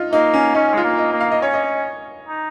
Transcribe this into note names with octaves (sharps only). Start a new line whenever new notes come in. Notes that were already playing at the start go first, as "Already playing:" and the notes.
Already playing: D#4 F4
A#3 D#4
C#4
C#4 D#4
G#3 F4
A#3
D#5
A#3
F5
D#5
C#4 C#5
D#5
D#4